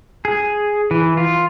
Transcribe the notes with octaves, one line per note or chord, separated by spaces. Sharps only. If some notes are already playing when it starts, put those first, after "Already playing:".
G#4
E3
F4